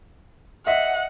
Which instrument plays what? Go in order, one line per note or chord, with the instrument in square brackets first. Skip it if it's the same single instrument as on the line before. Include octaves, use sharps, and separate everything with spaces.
[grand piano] D#5 E5 [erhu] F#5